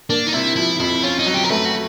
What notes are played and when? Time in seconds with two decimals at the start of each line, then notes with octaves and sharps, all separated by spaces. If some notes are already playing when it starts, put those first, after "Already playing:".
0.09 A#3 D4
0.27 D#4
0.33 C3 E4
0.56 F3 E4
0.80 F2 E4
1.03 C#4 F4
1.19 D#4
1.26 F#3
1.34 G4
1.44 A#4
1.50 A3 B4
1.65 F#4